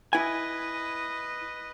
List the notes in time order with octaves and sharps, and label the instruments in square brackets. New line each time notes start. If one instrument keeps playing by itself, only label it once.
[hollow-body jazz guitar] E4 G#5 [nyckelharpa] B4 D#5